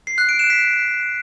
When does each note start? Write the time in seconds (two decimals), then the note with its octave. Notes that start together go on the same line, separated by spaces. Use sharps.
0.07 C7
0.18 F#6
0.29 D7
0.39 E7
0.50 B6